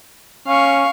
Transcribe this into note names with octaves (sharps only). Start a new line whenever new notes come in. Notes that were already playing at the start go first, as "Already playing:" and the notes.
C#4 F5 C#6